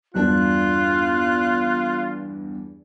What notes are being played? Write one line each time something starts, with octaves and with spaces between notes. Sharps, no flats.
E2 G2 D4 F4 F#6